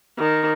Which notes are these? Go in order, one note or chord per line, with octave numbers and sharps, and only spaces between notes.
D#3